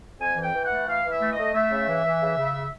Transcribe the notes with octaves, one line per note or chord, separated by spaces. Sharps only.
F2 G#5
E3
G5
E3
F#5
A3
E3 F5
E3
E5
A3
D#5
A3
A3 E5
C#3
E3
E3
C#3
C#3